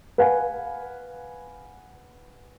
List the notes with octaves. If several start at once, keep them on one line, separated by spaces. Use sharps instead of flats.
B4 F5 F#5 G#5